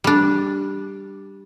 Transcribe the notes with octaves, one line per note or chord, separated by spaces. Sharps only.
G3 D4